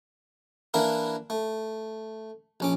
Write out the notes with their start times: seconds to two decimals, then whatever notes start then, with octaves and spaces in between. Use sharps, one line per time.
0.74 E3 A#3 D4 E4 A#4
1.30 A3
2.60 A#1 C#4 D6